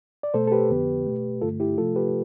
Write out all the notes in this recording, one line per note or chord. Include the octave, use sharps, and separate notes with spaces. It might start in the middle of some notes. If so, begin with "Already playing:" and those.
D5
B2 A3 A4 C5
A4
G4 B4
F2 D3 F3 B3
B2 A3
G2 D3 A3 F4 A4
E4 G4
C3 F3 A3 F4 A4
G4 B4